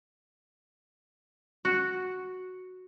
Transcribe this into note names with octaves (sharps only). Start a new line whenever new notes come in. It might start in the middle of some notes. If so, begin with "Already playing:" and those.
F#4